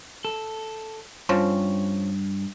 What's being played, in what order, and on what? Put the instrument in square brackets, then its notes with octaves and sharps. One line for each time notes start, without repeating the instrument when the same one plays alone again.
[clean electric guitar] A4
[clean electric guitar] G2 [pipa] F3 C4 C#4